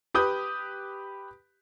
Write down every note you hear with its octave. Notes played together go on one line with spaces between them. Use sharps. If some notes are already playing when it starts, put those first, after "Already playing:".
G4 B4 D#6 G6